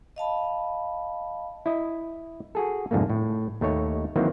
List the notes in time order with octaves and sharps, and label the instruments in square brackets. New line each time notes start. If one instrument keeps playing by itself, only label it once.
[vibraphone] D#5 F5 A5 B5
[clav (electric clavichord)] E4 D#5
F#4 G#4 A4
C2 F2 G#2 D3 A3 A#3
A2
D#2 A3 D#4 C#5
D#3 E3 F#3 A#3 C4